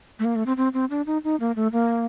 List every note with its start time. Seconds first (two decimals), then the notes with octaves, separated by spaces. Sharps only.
0.19 A3
0.25 A#3
0.36 A3
0.46 C4
0.57 C4
0.74 C4
0.90 D4
1.06 D#4
1.24 D#4
1.40 A#3
1.56 A3
1.73 A#3